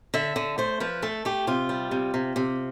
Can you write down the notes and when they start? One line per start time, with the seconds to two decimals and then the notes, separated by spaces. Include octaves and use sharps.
0.14 D3 E5
0.36 D3
0.58 A3 C5
0.80 F3 B4
1.02 A3 A4
1.25 A3 G4
1.47 C3 F4
1.69 G3
1.91 C3
2.14 C3
2.36 C3